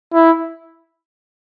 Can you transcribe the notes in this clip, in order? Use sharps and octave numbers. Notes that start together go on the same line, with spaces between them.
E4